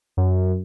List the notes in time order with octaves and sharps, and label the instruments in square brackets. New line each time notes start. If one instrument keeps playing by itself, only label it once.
[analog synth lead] F#2